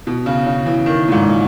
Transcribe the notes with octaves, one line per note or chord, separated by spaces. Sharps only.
B2
C#3
C#3
E3
D#3
A#2
G#2